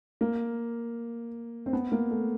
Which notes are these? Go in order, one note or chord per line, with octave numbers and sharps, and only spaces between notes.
A#3
C4
B3
A#3
A3